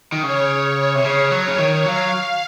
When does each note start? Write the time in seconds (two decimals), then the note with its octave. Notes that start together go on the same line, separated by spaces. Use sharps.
0.12 D#3
0.23 C#3 C#5
0.95 C3
1.04 C#3
1.31 F#3
1.47 C#3
1.58 D#3
1.86 F#3 F5